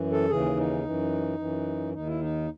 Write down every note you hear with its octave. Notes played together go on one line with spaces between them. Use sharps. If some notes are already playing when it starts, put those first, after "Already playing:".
Already playing: F#2 E3
A4
D#2 C#3 E3 G#4
D#4
F#2 E3
F#2 E3
D#2 D#3 D#4
E4
D#4